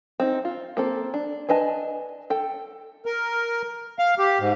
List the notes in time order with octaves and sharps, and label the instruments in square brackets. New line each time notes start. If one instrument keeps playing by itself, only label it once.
[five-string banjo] C4 D#4
F4
A#3 C4 A4
D4
D4 B4 D#5 G#5 A5
A4 G5
[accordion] A#4
F5
G4
G#2